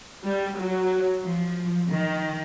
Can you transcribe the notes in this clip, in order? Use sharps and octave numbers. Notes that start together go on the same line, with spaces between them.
G3
F#3
F3
D#3